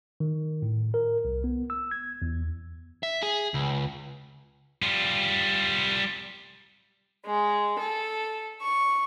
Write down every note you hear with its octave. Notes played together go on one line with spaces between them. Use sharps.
D#3
A2
A#4
C2
B3
E6
G#6
E2
E5
G#4
C#2
G3 F4
G#3
A4
C#6